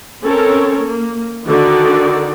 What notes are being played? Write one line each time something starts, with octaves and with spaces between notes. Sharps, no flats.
C4 C#4 A4 A#4 C#5
A#3
D3 D#3 D#4 F#4 D5